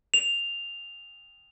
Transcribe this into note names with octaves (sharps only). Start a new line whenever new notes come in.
F7